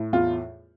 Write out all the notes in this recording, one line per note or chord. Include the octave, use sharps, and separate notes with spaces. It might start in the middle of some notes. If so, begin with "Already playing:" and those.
Already playing: A2
E2 F4